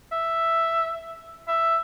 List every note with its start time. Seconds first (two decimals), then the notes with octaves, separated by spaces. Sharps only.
0.12 E5
1.48 E5